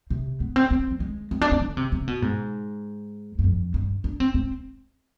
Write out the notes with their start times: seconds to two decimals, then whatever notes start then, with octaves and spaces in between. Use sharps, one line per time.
0.10 C3
0.40 B3
0.56 C4
0.71 C4
0.91 G3
1.00 G#3
1.31 C4
1.41 D4
1.52 C4
1.61 D3
1.77 C3
1.92 C3
2.08 B2
2.22 G#2
3.39 G2
3.44 F2
3.74 G2
4.04 D4
4.20 C4
4.34 C4